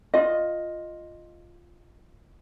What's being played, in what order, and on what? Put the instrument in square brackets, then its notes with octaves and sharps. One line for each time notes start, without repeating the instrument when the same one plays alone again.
[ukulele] F4 D#5